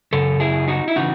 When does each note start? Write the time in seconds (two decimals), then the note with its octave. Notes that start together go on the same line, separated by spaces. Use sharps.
0.13 F#2 C#3 A4
0.40 E4 G#4
0.68 D#4 F#4
0.88 E4
0.96 C#3 E3 D#4 F#4